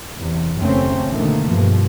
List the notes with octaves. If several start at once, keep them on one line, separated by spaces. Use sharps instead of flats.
E2 C3
F#1 D#2 A2 A3 C4 C#4
B2 D3 D#3 A3 A#3
G2 B2 F3